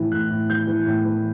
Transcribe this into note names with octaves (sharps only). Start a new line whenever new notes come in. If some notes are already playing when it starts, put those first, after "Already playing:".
Already playing: A2 E3
A2 F#6
A2
E3 G6
E3
A2
E3